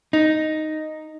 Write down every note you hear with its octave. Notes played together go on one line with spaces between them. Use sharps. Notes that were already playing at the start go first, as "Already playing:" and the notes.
D#4